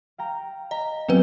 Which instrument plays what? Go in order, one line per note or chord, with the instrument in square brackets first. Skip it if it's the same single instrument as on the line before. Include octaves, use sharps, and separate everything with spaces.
[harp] F5 G5 A#5
[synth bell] D#5 [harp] A#5
[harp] F#3 F4 G4 [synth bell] B3 C4 B4